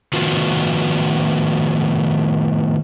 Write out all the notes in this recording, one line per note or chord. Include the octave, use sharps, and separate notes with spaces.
A2 D#3 F3 B3 F4 F#4